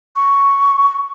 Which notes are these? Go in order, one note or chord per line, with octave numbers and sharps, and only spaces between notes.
C#6